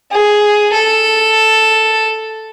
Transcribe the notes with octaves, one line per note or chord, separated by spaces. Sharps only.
G#4
A4